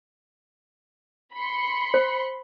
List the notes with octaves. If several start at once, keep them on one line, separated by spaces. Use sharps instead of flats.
B5 C6 C#7
C5